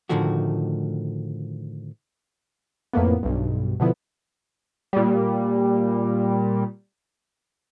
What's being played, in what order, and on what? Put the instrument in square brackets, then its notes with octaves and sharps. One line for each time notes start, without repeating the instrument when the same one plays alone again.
[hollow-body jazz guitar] A2 D3 D#3 F3 A3 F#4
[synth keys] F2 A2 A#3 B3
B1 G2
B2 D3 F3 B3 E4
[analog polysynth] A#2 G3